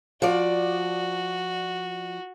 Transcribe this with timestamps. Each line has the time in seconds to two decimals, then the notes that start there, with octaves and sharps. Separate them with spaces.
0.22 F3 F#4 D5